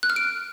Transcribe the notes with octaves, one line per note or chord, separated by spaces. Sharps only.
F#6
F6
D7